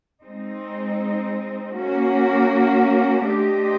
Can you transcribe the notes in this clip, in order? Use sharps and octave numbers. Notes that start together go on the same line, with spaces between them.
G#3 C4 D#4
A#3 C#4 F#4
A3 D4 G4 C5 D#5